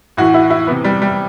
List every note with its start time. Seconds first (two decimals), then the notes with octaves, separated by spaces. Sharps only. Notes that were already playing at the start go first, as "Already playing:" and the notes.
0.17 A2 E3 F#4
0.34 E4
0.50 E4
0.67 C3 E3 B3
0.84 G3
1.02 G3